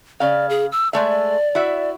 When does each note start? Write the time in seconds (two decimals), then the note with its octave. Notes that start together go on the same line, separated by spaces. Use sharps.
0.20 C#3 D5 F5
0.49 G#4
0.72 E6
0.93 G#3 A3 D5 E5
1.55 E4 F#4 E5